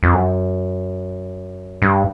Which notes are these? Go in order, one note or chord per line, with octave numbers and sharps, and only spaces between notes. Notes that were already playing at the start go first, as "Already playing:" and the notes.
F2
F#2
G2